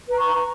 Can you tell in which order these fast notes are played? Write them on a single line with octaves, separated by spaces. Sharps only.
B4 A#5 C#6